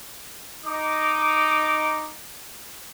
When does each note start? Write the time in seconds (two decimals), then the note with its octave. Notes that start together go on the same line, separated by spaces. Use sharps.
0.64 D#4 D6